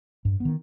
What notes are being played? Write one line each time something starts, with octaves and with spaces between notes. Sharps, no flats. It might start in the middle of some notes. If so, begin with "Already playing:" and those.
G2
D#3 B3